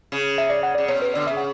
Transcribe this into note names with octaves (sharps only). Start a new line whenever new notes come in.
C#3
E5
D5
F#5
C#3 D5
B2 C#5
B4
D3 D5
C#3 E5
F#5